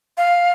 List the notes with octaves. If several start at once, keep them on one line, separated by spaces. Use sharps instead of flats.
F5